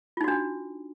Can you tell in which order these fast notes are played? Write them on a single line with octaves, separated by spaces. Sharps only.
F4 D#4 F#4 D4